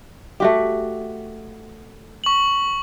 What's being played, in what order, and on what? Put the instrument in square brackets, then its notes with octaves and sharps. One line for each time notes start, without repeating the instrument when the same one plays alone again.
[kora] A3 F#4 G4
[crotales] C#6 F#7